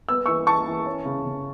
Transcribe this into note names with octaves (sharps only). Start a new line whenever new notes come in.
B3 E6
E3 C#6 E6
E3 A5 C#6
E3
C#4
C#3
C#3